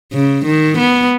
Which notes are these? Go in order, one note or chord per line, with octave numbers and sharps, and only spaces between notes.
C#3
D#3
B3